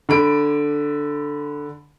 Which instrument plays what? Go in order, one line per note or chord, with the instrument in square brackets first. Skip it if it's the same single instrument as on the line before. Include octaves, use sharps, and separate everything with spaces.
[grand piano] D3 B5 D7